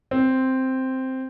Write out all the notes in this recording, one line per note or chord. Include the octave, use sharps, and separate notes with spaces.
C4